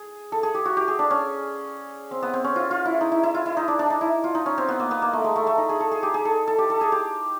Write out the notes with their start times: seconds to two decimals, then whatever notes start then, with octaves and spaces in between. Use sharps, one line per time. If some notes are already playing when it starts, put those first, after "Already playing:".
Already playing: G#4
0.32 A4
0.43 G#4
0.55 G4
0.65 F#4
0.77 G4
0.88 G#4
0.99 D4
1.10 C#4
2.11 C4
2.23 B3
2.34 C4
2.44 C#4
2.56 F4
2.71 F4
2.85 E4
3.01 D#4
3.12 E4
3.23 E4
3.34 F4
3.46 E4
3.57 D#4
3.68 D4
3.79 D4
3.90 D#4
4.01 E4
4.24 F4
4.35 D#4
4.46 C#4
4.58 C4
4.68 B3
4.80 A#3
4.91 B3
5.02 A#3
5.13 A3
5.24 G#3
5.36 A3
5.47 A3
5.58 D#4
5.69 G#4
5.80 A4
5.91 G#4
6.03 G4
6.14 G#4
6.25 A4
6.48 A4
6.58 G4
6.70 A4
6.81 G#4
6.92 G4